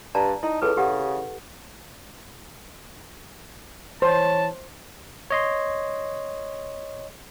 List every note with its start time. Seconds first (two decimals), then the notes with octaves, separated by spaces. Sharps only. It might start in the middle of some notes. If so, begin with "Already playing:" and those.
0.15 G2 D5 A5 A#5
0.43 D#4 E4
0.62 C#2 G#4 A4 B4
0.77 C#3 G4 F#5
4.02 E3 C5 C#5 A5
5.30 C#5 D#5 C6